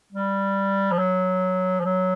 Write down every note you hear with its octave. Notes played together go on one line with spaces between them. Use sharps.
G3
F3
F#3
F3
F#3